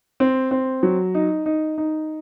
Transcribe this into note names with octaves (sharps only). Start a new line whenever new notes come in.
C4
C4
F#3
D#4
D#4
D#4